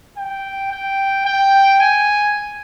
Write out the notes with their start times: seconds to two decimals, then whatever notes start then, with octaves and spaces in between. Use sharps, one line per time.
0.17 G5
0.72 G5
1.26 G5
1.80 G#5